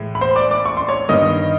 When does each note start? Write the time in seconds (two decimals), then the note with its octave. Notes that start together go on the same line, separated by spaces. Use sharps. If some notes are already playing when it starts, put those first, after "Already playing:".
Already playing: A2 E3 G#3
0.15 B5
0.21 C5 C6
0.36 D5 D6
0.51 D5 D6
0.66 C#6
0.77 C6
0.89 C#5 C#6
1.09 G2 D#3 G3 B3 D#5 D#6